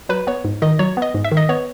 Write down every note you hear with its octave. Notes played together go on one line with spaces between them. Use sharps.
F#3 B4
B3 C#5
G#2
D#3 D#5
F#3 C#5
B3
D#5
G#2
E5
D#3
D#5
B3 C#5